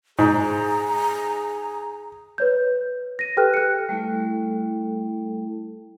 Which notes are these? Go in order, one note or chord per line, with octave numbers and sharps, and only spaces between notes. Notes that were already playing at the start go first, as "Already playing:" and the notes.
G#2 G#4 A#5
B4 C#5 G6
A#6 D#7
G4 A4 B4 G5 F6 F#6
F#6 C#7
G3 A3 E4 A4